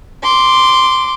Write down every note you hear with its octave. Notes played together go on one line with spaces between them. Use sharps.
C6 D6